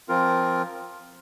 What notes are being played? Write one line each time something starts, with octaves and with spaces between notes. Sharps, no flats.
F3 C4 F4 A#4